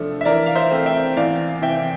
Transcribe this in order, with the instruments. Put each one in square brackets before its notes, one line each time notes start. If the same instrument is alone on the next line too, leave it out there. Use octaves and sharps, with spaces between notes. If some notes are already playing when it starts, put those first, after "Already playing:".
Already playing: [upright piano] C3 F3 A3 D4 A4
[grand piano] E5
[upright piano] E3 [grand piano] A#4 D5
[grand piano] F5
C5 E5
[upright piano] A3 C4
[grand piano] E5 G5
[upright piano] E2 [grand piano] D5 F5
[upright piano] C3 E3 [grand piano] E5 G5